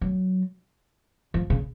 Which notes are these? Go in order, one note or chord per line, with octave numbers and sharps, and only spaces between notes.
F#3
F3
C#3